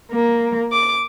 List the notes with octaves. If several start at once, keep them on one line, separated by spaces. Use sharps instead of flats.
A#3
D6